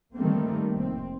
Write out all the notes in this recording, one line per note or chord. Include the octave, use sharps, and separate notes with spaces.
D#3 G3 A3 A#3 C4
F1 C4